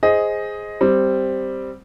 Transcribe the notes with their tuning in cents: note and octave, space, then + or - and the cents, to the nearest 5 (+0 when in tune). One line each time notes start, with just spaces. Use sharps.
G#4 +0 C5 +0 D#5 +10
G3 +0 C4 +0